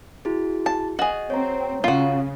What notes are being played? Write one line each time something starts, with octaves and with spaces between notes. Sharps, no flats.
E4 F#4 G#4
A5
F#4 G#4 D#5
C4 C#5 A#5
C#3 F4 F#4